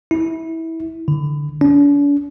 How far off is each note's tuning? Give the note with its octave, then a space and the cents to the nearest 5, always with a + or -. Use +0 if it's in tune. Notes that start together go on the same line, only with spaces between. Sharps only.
E4 -20
D3 +5
D4 -45